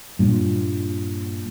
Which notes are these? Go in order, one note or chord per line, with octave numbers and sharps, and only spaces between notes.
G2 A#2